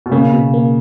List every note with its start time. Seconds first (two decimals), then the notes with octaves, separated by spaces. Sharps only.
0.06 B2
0.11 C#3 A#3
0.33 B2
0.54 A#3